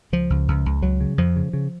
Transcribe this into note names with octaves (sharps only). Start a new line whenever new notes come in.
C#2 F3
C#2
C#2
C#2
C#2 F#3
C#3
F2 F3
C#3
C#3